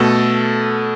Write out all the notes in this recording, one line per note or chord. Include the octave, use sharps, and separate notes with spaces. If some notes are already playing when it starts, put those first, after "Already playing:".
Already playing: B2 A3 A4